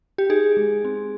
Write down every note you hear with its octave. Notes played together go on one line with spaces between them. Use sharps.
G4
D#4 G#4
G#3
C4